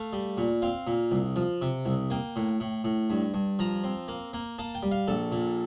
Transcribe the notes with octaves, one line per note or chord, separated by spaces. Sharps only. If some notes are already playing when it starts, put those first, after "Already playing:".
Already playing: A3 F5
G3
A#2
C4 F5
A#2
C2
F3
C3
C2
A#3 G5
A2
A2
A2
G2
G2
F3 A#5
C4
A#3
A#3
A#3 A5
G5
G3
F5
A#1 A4
A#2